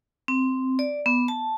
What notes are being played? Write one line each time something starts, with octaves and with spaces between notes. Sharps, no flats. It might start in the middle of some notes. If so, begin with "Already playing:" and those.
C4
D5
B3
A5